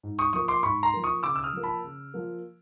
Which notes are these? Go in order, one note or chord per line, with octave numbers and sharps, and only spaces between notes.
G#2
C#6 D#6
F3 A#3 C#6 D#6
C6 D6
G#2 B5 C#6
A#5 C6
F3 A#3
C#6 D#6
C#3 D6 E6
E6
D#6 F6
F3 A#3
A5 B5
C#3
F3 A#3